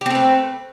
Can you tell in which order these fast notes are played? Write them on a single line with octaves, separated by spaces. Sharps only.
G4 C4 A3 B4